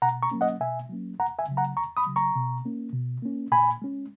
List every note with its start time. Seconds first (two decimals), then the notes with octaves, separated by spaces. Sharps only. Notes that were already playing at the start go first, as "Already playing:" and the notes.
0.02 B2 F#5 A#5
0.23 A#5 C#6
0.31 F#3 A#3 C#4
0.41 D#5 F#5
0.61 B2 E5 G#5
0.89 F#3 A#3 C#4
1.19 E2 F#5 A#5
1.39 E5 G#5
1.48 C#3 F#3
1.57 F#5 A#5
1.77 E2 A#5 C#6
1.97 B5 D#6
2.06 C#3 F#3
2.16 A#5 C#6
2.36 B2
2.65 A#3 C#4
2.93 B2
3.22 A#3 C#4
3.52 A#2 G#5 B5
3.82 G#3 C#4